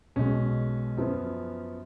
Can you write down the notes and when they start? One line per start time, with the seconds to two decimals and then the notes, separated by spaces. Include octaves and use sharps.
0.16 B1 B2 G#3 C#4
0.97 F#2 F3 B3